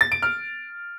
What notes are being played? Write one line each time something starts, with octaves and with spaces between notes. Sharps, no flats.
A6
D7
F6